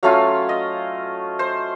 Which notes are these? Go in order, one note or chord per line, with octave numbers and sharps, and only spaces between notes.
F#3 A3 C#4 F4 F5
D#5
C5